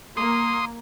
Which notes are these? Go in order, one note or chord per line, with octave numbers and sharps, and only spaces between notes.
A#3 C6 D#6